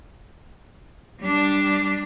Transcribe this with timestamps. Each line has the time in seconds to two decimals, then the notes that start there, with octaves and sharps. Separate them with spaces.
1.20 G3 D4